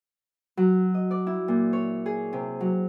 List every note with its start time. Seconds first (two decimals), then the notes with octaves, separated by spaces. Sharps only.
0.57 F#3
0.94 D#5
1.11 D5
1.27 E4
1.48 A#2
1.73 C#5
2.06 G#4
2.33 C3
2.60 F#3